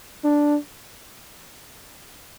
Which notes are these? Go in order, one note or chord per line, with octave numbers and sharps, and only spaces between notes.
D4